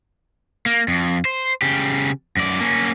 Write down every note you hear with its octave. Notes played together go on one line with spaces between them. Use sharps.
A#3
F2
C5
C#3 G4
F#2 D5
A#3 C#4